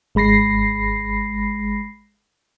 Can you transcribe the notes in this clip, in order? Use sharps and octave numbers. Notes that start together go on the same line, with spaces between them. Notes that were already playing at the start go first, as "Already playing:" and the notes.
G#1 G#3 B5 A#6 C7